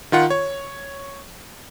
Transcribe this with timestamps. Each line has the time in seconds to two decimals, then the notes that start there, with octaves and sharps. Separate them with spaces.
0.12 D#3 F4 F#5
0.30 C#5